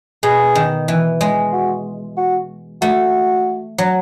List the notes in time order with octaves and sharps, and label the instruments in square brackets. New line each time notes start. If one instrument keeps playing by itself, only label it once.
[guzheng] B2 [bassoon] G#4
[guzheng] D#3
E3
G#3
[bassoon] F#4
F#4
[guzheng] A3 [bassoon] F#4
[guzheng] F#3